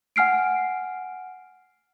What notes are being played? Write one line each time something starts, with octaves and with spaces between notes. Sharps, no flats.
F#5 G#5 F6 C7 D7